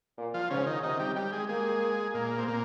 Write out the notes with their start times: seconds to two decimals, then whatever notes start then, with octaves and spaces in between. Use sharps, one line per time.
0.18 A#2
0.34 F3 F4
0.50 G#2 C#3 C#4
0.66 D#3 D#4
0.83 C3 D#3 D#4
0.99 G3 G4
1.16 G3 G4
1.32 G#3 G#4
1.49 G#3 A#3 G#4
2.14 A#2 A#3
2.38 C4
2.48 A#2 A#3